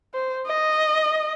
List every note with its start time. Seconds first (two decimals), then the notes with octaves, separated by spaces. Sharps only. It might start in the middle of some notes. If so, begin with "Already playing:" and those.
0.14 C5
0.46 D#5